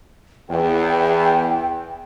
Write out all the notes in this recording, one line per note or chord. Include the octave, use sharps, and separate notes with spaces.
E2 G5